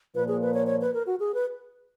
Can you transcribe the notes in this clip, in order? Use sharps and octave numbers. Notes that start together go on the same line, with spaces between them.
A#2 F3 A#3 B4
G#4
B4
C#5
C#5
B4
A#4
F#4
G#4
B4